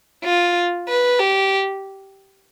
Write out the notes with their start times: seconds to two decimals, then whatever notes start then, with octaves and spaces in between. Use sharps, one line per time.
0.24 F4
0.88 B4
1.19 G4